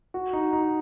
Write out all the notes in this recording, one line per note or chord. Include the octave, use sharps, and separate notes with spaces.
F#4
D#4
D#4